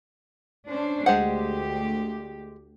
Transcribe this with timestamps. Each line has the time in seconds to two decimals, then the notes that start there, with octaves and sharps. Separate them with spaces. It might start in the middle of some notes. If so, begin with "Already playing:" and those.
0.67 C#4 D4 C5
1.06 D2 G#3 G4 C5 F#5